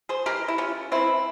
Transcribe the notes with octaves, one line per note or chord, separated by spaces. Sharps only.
G#4 C5
E3 G#3 G4 A#4
E4
C#4 F4
E3 G#3 C4 E4